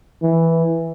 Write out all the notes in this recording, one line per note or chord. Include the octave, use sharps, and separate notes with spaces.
E3